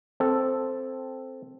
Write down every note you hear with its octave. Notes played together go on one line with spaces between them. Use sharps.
C4 A4